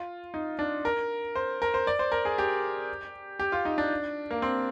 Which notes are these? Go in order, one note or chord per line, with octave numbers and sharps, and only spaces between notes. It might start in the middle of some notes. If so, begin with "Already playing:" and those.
Already playing: F4
D#4
D4
A#4
C5
A#4
C5
D5
C5
A#4
G#4
G4
G4
F4
D#4
D4
A#3
C4